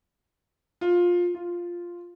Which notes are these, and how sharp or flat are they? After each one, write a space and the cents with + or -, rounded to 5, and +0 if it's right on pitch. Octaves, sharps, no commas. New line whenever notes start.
F4 +15
F4 +0